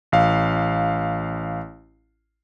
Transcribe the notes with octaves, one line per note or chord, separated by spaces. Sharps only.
A1 F5